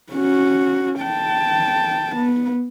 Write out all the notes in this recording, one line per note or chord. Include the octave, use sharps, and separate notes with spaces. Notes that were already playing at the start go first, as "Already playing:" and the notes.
C#4 F#4
G5 A5
B3